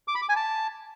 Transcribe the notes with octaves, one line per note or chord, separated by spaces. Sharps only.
D6
B5
D6
G#5
A5